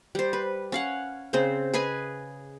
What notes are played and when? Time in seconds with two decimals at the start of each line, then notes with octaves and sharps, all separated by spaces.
0.15 G3 C5
0.33 B4
0.72 C#4 F5 F#5
1.33 C#3 C4 C5
1.74 G#4 B4 D#5 G#5